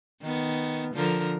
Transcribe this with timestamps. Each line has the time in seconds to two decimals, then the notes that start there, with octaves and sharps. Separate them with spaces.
0.22 D#3 B3
0.94 D3 F3 A#4